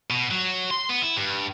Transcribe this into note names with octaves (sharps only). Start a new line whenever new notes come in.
B2
F#3
C6
B3
E4
G2